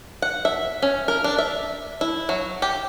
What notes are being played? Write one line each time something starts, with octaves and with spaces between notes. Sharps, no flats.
F#5
E5
C#4
A#4
D4
E5
E4
F#3
G4